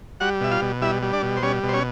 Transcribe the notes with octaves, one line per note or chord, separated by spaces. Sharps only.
G3 F#4 F#5
B2 E5
F4 F5
B2
G3 E4 E5
G3
D4 D5
B2
C5
G3 C#4 C#5
B2
C5
C#4 C#5